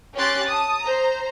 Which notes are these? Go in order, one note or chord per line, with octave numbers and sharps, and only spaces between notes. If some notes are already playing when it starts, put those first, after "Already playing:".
C#4 G4 C6 F#6 A6
A5 D#6
C5 A#5